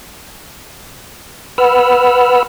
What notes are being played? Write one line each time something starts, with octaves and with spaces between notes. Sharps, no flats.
B4 F#5 B5 E6 F6